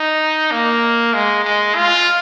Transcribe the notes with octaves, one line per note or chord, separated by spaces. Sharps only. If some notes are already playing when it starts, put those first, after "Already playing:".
Already playing: D#4
A#3
G#3
G#3
F4